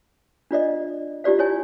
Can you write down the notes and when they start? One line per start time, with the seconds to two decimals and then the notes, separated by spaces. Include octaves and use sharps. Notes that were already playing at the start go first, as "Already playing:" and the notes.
0.51 D4 F4 D5 D#5
1.24 D#4 F4 G4 D5 F5
1.39 E4 C#5 G#5